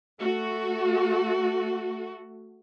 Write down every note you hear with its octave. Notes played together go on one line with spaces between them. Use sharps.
A3 F#4